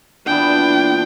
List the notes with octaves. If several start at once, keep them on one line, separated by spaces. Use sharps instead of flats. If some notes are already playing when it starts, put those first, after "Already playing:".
A#2 E3 B3 D4 G5